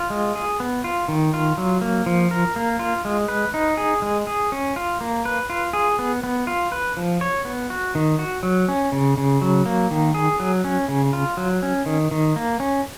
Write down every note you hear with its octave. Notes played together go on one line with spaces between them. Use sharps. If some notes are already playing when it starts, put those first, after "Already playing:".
Already playing: F4
G#3
G#4
B3
F4
D#3
F4
F#3
A#3
F3
A#4
A#3
F4
G#3
B4
D#4
G#4
G#3
G#4
C#4
F4
A#3
B4
F4
G#4
B3
B3
F4
B4
F3
C#5
B3
F#4
D#3
F#4
F#3
C#4
C#3
C#3
F#3
A#3
D#3
G#4
F#3
C#4
C#3
F4
F#3
C#4
D#3
D#3
A#3
C#4